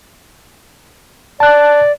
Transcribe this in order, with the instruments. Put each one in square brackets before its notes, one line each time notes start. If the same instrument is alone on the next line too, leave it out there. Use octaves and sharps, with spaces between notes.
[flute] D5 [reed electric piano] A5 F#6